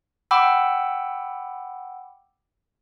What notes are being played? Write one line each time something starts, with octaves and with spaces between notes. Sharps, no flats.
F#5 G5 B5 D6 E6